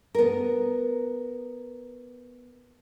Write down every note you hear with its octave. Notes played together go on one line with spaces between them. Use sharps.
B3 A#4